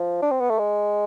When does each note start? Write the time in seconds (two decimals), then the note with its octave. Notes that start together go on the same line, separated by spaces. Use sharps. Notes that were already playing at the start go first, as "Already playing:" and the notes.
Already playing: F3
0.22 D4
0.31 C4
0.40 B3
0.50 A3
0.59 G#3